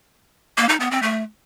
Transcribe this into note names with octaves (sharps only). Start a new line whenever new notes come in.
A#3
D#4
B3
C4
A3